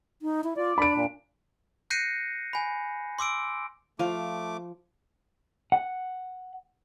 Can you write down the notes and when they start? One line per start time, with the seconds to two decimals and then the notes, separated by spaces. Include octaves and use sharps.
0.22 D#4
0.44 E4
0.57 F4 D5
0.78 D4 B5 D7
0.94 A#2
1.90 F#6 G6 A#6 C7 C#7 D#7
2.53 G#5 B5
3.19 C6 D6 E6 D7
3.99 F3 A3 F4 C5 F5 D6
5.72 F#5